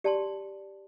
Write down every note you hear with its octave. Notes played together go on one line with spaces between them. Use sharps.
G4 D5 A5 C6